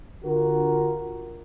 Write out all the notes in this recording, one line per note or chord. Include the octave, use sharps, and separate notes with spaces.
D3 F4 F#4 A#4